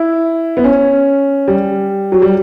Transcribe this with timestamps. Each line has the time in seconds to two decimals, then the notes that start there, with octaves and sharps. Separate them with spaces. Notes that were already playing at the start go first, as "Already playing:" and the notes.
Already playing: E4
0.57 B3
0.64 C#4
1.48 G3
2.12 F#3
2.22 G3